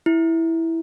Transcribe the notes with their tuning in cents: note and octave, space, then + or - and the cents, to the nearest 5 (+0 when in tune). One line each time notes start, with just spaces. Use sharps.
E4 -5